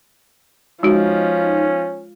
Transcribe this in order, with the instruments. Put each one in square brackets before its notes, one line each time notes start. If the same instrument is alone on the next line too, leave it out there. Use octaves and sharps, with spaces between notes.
[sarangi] F3 [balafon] G#3 F#4 [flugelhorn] C#4 [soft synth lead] D#4